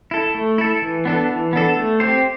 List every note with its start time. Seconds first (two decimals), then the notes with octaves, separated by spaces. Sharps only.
0.11 E4 A4
0.35 A3
0.58 E4 A4
0.82 E3
1.05 B3 D4 A4
1.30 E3
1.53 B3 D4 A4
1.77 A3
2.00 C4 G4 C5